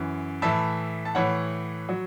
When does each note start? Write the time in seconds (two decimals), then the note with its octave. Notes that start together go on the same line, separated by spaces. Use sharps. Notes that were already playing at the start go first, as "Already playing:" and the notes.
Already playing: F#2 E3
0.42 A2 E3 E5 A5
1.05 A5
1.15 A2 E3 C#5 F#5
1.89 F#3